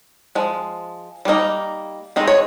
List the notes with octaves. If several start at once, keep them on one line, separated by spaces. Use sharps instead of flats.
F3 G#3
G3 A#3 D#4
D#3 G#3 C4 D#4
C#5